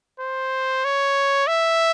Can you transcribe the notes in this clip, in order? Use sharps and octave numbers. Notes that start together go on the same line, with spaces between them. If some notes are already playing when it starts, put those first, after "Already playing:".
C5
C#5
E5